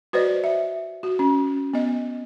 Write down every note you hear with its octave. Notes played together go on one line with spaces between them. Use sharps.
F#4 B4 C5 D5 D#5
E5
F#4
C#4
B3 D#5